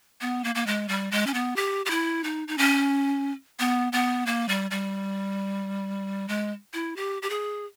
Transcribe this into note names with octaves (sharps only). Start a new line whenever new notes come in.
B3
A#3
A#3
G#3
G3
G#3
C#4
B3
G4
G4
E4
D#4
D#4
C#4
B3
B3
A#3
G3
G3
G#3
E4
G4
G4
G#4